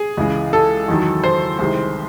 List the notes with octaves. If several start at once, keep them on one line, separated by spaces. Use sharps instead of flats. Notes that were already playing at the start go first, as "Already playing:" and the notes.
Already playing: G#4
C#2 C#3 E3 G#3
A4
E2 D#3 F#3
C5
C2 C3 D#3 G#3